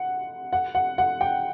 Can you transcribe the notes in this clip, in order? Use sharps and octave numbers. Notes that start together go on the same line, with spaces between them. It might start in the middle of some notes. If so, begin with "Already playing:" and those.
Already playing: F#5
F#5
F#5
F#5
G5